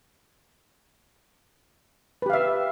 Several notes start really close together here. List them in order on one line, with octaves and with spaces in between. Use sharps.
B4 G4 F5 E5